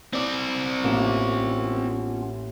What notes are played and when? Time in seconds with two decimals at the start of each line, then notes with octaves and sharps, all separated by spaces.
0.13 C4 D5
0.84 A1 A#3 B3 C#4 F4 E7